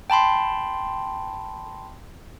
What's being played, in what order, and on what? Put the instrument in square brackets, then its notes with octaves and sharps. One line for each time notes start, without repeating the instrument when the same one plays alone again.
[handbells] G5 A5 B5 C6